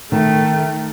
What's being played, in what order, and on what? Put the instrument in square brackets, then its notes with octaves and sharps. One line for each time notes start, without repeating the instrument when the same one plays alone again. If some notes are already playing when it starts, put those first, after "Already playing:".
[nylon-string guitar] D#3 [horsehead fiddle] A3